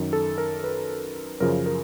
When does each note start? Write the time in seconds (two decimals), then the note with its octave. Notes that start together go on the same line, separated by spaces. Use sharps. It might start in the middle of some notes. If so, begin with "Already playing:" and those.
Already playing: F#2 D#3
0.13 A4
0.38 A#4
0.64 B4
1.40 F#2 C#3 F3 A#4
1.66 A#4